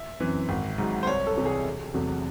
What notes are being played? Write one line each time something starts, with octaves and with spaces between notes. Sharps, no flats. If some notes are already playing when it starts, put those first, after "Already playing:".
Already playing: E5
F#2 E3 C4
G#1
G#2 F#3
C5
C2 C#5
A4
C3 E3
G#4
E1
E2 C3 F#3 A3